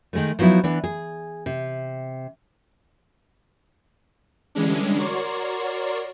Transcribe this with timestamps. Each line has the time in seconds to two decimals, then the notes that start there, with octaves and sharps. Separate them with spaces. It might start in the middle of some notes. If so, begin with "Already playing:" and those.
0.13 D#3 G#3 A3
0.39 F3 F#3 B3 D#4 E4
0.64 E3 B3 D4
0.84 G#4
1.46 C3
4.55 D3 E3 G3 G#3 C#4 D4
4.98 F#4 A#4 C#5 D5 C6